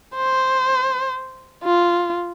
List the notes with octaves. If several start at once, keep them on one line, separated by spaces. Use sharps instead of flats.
C5
F4